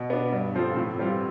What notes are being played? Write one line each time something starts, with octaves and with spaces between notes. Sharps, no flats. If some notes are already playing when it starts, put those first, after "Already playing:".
Already playing: B2
B3 D4
G2
F3 C4 F4 A4
A2
E3 G3 C4 F4